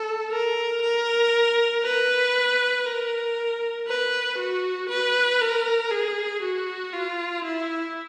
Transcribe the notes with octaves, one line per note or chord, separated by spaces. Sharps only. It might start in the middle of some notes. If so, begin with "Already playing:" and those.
Already playing: A4
A#4
A#4
B4
A#4
B4
F#4
B4
A#4
G#4
F#4
F4
E4